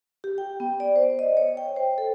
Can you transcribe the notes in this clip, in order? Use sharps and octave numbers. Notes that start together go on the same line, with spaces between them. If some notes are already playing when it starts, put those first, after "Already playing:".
G4
G5
B3
D5
C5
D#5
C#5
G5
C5
A4